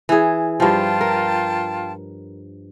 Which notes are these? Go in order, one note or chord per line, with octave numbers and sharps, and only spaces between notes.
E3 G#4
G2 F3 F4 G5 A5
A#4